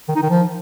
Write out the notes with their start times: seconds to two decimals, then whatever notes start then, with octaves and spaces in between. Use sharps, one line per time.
0.08 D#3
0.16 D#4
0.23 D#3
0.30 F3